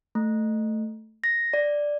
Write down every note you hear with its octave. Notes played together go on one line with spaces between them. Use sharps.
A3
A#6
D5